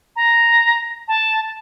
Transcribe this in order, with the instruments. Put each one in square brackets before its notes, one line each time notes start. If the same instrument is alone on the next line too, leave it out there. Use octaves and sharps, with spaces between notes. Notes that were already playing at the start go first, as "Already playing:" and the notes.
[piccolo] A#5
A5